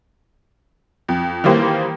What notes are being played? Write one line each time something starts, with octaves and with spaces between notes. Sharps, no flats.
F2
D#3 E3 G3 A#3 C5